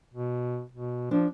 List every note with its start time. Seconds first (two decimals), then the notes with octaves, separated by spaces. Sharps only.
0.14 B2
0.72 B2
1.11 F3 D4